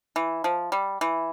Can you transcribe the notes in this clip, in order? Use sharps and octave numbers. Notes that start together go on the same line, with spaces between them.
E3
F3
G3
E3